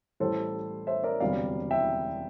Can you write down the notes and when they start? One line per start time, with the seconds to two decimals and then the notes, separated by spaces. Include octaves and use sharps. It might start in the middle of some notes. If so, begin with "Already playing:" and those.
0.20 A1 A2 G3 A4 C5
0.87 C5 E5
1.04 A#4 D5
1.20 E1 D2 C3 G3 D5 F5
1.71 E5 G5